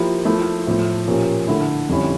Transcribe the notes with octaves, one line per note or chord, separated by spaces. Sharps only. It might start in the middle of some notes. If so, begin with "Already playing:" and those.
Already playing: F3 A#3 E4 G4
F3 A3 E4
A2 F3 A3
A#2 F3 C#4 G4 A#4
D3 A3 E4
F2 D3 G3 C#4 E4